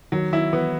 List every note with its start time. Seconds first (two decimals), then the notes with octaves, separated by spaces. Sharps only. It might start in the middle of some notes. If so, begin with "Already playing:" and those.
0.12 D#3 F#3
0.32 D#3 E4
0.53 E3 B3